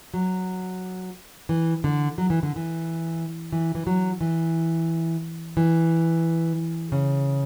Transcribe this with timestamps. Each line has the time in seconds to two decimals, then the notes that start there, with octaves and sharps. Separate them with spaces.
0.14 F#3
1.49 E3
1.84 D3
2.18 F#3
2.30 E3
2.43 D3
2.56 E3
3.52 E3
3.75 E3
3.87 F#3
4.21 E3
5.57 E3
6.92 C#3